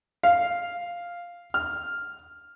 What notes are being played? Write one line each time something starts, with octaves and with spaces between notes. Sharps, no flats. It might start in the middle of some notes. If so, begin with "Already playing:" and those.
F5
F6